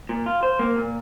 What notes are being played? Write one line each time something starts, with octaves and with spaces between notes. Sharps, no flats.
A#2
F4
C5
A#3
A#2